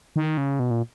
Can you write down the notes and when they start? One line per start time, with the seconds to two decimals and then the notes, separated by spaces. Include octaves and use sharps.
0.16 D#3
0.37 C#3
0.60 B2
0.71 A#2